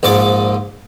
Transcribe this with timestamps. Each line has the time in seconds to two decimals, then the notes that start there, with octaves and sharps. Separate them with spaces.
0.03 A#1 G#2 D5 D6